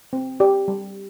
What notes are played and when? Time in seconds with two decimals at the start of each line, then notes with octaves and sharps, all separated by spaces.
0.13 C4
0.40 G4 D5
0.68 G3